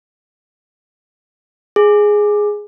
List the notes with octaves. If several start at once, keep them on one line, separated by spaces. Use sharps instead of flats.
G#4